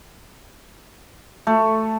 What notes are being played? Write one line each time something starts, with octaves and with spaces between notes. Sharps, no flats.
A3